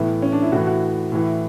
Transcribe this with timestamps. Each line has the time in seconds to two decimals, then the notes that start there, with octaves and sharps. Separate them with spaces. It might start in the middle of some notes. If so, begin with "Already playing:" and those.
Already playing: A2 E3 B3
0.22 C#4
0.32 D4
0.42 E4
0.52 A2 E3 F#4
0.67 F#4
1.12 A2 E3